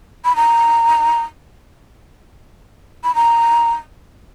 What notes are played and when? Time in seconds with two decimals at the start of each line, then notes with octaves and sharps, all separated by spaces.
0.25 B5
0.36 A#5
3.04 B5
3.15 A#5